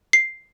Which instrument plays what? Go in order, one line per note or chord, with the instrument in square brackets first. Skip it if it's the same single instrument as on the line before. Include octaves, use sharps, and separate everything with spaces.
[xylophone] C7